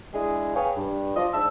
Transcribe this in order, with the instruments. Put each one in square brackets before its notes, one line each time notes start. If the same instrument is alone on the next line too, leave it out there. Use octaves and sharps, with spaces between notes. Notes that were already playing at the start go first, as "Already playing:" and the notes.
[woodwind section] G#3 D4 E4 G#4
G#4 B4 C#5 F5 G5 G#5
G2
F3 F4 D5 D#5
G#2 D4 C5 A5 E6